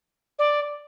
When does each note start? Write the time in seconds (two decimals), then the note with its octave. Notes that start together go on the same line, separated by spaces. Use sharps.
0.39 D5